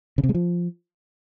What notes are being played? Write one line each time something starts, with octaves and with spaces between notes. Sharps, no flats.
C#3
C3
G#3
F3